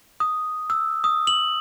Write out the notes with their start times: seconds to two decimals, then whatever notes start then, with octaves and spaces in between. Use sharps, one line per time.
0.20 D#6
0.70 E6
1.04 D#6
1.27 F#7